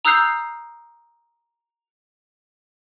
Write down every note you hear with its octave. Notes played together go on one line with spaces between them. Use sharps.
A#5 D#6 E6 F#6 G6 C7